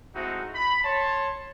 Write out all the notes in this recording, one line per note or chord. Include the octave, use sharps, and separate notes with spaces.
G#3 A3 C4 D#4 E4 F#4
B5
C#5 A5 C6